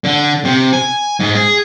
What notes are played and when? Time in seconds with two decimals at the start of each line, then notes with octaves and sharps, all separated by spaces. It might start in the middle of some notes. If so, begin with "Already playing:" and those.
0.04 D3
0.45 C3
0.73 G#5
1.20 G#2
1.35 G#4